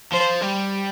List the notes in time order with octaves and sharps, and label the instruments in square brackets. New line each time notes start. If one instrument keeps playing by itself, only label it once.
[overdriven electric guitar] F3 [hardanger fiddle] C5
[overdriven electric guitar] G3